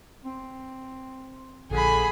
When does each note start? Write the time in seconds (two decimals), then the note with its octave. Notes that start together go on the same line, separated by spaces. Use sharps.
0.25 C4
1.71 A#1 D3 G#4 B5